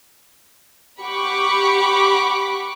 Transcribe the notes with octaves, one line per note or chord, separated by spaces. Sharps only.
G4 F#5 B5 C#6 D6